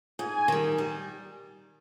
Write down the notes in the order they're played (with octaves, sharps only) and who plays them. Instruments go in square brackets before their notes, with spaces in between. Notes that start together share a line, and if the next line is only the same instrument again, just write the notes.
[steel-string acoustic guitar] G#2 [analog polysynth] G#5
[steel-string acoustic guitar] D#3 G3
G3